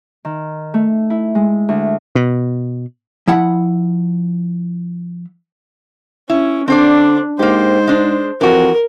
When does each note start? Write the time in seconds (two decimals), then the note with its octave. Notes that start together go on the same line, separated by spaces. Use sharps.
0.25 D#3
0.74 A3
1.10 E4
1.35 G#3
1.69 D2
2.15 B2
3.27 F3 E4 F#5 B5
6.30 C#4 E4
6.68 D3 C4 D4 C5 D5
7.39 G#2 A#3 G4 C5
7.87 G#3 D4
8.41 F2 E3 F#4 A#4